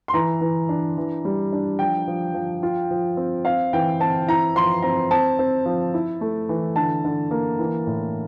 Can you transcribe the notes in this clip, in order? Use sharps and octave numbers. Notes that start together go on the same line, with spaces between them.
C6
E3 A#5
E3
D4
E3
G3
D4
F3 G5
F3
F3
F4
F3
C4
C4 F5
E3 G5
C4 A5
E4 A#5
F3 C6
C4 A#5
C4 A5
C4
F3
E4
A3
E3
D3 A5
D3
A#3
E3
A2